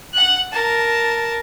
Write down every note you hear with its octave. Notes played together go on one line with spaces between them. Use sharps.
F#5 F#6
A#4 A5